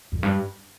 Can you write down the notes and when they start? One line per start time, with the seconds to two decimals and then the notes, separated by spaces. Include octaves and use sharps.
0.12 F2
0.23 G2